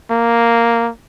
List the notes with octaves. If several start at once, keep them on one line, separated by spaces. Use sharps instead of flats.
A#3